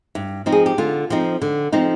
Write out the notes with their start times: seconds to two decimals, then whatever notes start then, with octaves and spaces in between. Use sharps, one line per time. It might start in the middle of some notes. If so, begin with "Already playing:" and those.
0.15 G2
0.46 F3 C4 D#4
0.52 G#4
0.66 G4
0.78 D3 F4
1.10 F3 C4 D#4
1.42 D3
1.72 F3 C4 D#4